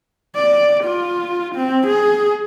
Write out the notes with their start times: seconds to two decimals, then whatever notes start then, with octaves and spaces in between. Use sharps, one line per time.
0.36 D5
0.84 F4
1.55 C4
1.87 G#4